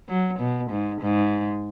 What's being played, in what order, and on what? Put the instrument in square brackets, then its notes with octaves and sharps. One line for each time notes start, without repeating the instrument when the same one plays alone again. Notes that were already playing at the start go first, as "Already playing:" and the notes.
[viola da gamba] F#3
B2
G#2
G#2